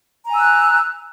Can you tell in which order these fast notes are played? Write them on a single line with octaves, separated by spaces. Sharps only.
A#5 G#5 E6 F#6